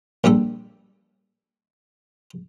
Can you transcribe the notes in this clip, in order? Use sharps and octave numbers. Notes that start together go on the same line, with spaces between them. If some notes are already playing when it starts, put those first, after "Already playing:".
A#1 G3 G4 A4